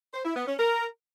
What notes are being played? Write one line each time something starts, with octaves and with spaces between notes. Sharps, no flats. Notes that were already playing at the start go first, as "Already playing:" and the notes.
C5
E4
B3
C#4
A#4